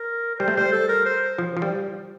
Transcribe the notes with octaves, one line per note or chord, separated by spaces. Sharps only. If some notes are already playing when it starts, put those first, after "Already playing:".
Already playing: A#4
A#4
G3 C5
A3
G3 C5
A4
A#4
C5
F3
F3
G3